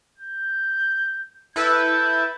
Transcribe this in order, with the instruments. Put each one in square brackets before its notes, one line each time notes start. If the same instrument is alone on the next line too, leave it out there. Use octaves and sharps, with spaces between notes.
[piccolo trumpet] G6
[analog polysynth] E4 A4 B4 [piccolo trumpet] G6